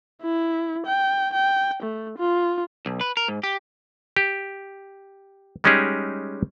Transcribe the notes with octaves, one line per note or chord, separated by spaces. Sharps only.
E4
G5
G5
A3
F4
B1
B4
A#4
G#2
G4
G4
G3 G#3 C#4 D#4 G4 G#4